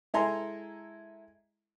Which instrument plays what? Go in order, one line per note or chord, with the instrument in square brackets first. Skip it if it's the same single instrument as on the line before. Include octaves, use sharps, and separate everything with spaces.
[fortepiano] G#3 E4 A4 G#5 A#5 C6